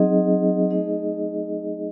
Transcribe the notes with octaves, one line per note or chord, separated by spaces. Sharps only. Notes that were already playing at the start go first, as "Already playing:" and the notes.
Already playing: F#3 C4 D#4 G#4 D#5
A3 D#4 G#4 D#5